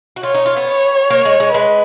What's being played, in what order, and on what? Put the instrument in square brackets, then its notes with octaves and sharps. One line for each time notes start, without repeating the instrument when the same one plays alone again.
[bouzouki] F#4
[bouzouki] F4 [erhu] C#5
[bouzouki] D#4
F4
B3
[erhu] C#5
[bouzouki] A#3
G#3
G#3
[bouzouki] G#3 [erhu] B4